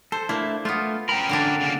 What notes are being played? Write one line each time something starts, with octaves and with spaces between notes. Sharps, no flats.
A4 C5
A3 A#3 D4 E4
A3 B3 F4 F6
C#4 A#4 G5 A#5 B5
D3 A#3 D4
C#3 A#3